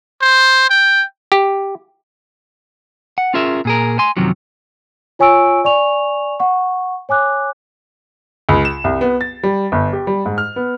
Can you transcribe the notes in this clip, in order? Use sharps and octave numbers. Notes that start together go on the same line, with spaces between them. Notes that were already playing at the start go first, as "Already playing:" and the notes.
C5
G5
G4
F#5
C#4 F4 G#4 A#4 E5
A#2 G#4 A#4
G#5 C6
F#2 C3 D#3 F3 F#3
F4 C#5 G#5 C#6 E6 D7
D5 G#5 C#6 F7
F#5 C#6
C#5 G#5 D6 F#6
C#2
E7
C2
B3
A6
G3
G1
G4
G3
G#2
F6
B3